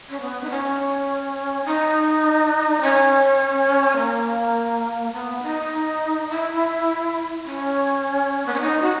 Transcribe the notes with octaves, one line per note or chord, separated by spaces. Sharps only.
C#4
B3
D#4
C#4
D#4
C#4
A#3
B3
D#4
E4
C#4
B3
C#4
D#4
F#4